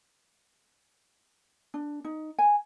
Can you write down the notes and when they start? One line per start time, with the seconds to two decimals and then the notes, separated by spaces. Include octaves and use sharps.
1.74 D4
2.05 D#4
2.39 G#5